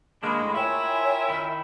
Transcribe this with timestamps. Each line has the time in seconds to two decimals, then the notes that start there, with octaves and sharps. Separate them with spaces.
0.23 D#3 G#3 A#3 D4 B5
0.41 A2
0.55 E4 F4 A#4 C#5 E5 G5 G#5
1.29 D#3 E4